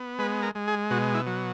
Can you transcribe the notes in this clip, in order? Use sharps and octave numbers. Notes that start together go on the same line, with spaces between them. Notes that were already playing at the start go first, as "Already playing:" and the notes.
Already playing: B3
G#3 B4
A#4
G#3
G#4
B2 F#4
E4
F#3